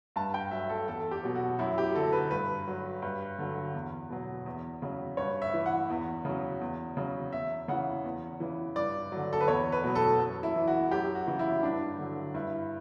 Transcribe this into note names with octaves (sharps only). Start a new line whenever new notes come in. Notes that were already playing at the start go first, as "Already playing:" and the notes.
G2 A5
G5
F#3 E5
A4
E2 A4
G4
B2 F#3
F#4
F#2 E4
G4
D3 F#3 A4
B4
G2 B4
F#3
G2
D3 F#3
E2
B2 F#3
E2
C#3 F#3
G2 C#5
E5
E3
F#5
E2
C#3 F#3
E2
C#3 F#3
E2 E5
C#3 E3 F#5
E2
C#3 E3
G2 D5
D3 F#3
A4
B4
E2 C#5
B4
B2 F#3
A4
F#2
E4
E3
F#4
F#2 G4
F#4
C#3 E3
E4
G2 D4
D3 F#3
G2 E4